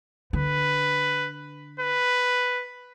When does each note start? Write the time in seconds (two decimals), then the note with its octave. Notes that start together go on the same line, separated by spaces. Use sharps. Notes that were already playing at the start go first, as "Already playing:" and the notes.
0.33 D3 B4
1.80 B4